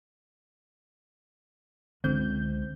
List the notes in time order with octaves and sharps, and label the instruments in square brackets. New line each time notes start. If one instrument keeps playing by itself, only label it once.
[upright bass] C#2 G#3 [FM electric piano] D3 C4 G6